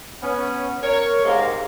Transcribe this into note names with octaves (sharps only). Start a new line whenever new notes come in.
B3 C#4
A#4 C#5
G#2 C3 G#3 A#3 F5 A#5